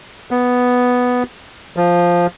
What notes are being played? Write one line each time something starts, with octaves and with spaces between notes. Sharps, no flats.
B3
F3